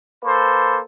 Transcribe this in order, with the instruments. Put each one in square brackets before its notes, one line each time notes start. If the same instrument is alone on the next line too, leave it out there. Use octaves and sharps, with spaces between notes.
[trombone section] A#3 A4 B4 C5